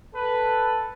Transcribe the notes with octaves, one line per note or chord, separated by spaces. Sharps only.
A4 B4